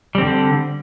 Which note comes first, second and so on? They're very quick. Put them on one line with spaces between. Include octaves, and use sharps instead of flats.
G3 C4 D3